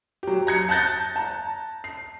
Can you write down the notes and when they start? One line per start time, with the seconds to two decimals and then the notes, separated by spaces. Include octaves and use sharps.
0.23 F#3 G4
0.47 A#5 G#6 C#7
0.69 A5 F#6 G6 A6 A#6
1.16 A5 A#5
1.84 C7